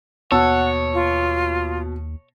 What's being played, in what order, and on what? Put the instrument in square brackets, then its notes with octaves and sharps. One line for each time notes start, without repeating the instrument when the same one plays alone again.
[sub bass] D#2 [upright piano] B2 A5 E6 [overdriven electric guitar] C#5 [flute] F#5
[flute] F4